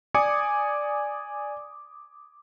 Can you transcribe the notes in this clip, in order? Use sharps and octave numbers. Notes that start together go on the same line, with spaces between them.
D5 G#5 D6 D#6 G#6 C#7